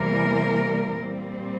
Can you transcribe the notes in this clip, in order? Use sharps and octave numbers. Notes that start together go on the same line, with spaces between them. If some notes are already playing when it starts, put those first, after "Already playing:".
Already playing: E2 C3 E3 G3 A#3 A#4
A#2 G3 C4